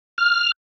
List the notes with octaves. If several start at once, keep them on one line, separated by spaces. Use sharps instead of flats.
F6